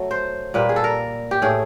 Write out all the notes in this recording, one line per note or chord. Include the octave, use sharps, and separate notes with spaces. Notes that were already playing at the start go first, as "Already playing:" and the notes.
Already playing: F#3 A3
C5
A#2 G3 A#3 B4
G#4
A4
A#4
G4
A2 E3 A3 G#4